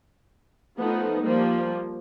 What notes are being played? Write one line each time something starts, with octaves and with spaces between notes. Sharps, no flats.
F3 A3 B3 D#4
F3 G3 A#3